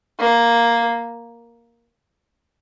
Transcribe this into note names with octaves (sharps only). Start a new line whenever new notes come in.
A#3